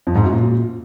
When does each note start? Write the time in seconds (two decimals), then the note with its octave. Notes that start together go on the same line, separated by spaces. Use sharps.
0.07 F2
0.15 G#2
0.24 F#2
0.33 A#2